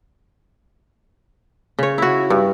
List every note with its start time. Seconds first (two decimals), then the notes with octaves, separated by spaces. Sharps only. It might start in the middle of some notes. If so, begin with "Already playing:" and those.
1.79 C#3 C#5
1.98 E4 F#4
2.30 G2